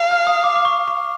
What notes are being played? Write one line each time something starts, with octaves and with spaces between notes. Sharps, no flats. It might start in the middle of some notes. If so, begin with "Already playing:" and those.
Already playing: F5
F6
D#6
D6
D6
C#6
C#6